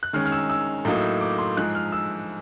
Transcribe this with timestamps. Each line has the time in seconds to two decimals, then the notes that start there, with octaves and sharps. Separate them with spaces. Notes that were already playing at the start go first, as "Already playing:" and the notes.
0.03 F#6
0.13 D#3 G#3 C#4 F6
0.26 F6
0.32 E6
0.50 E6
0.85 A2 F#3 A#3 D#4
1.21 D6
1.38 C6
1.57 G#2 F3 G#3 F#6
1.75 F6
1.92 E6